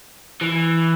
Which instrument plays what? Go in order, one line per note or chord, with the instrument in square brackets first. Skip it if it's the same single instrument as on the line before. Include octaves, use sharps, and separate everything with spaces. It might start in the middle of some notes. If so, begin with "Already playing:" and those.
[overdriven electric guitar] E3